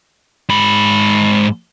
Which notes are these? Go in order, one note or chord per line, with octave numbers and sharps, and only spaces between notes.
G#2 B5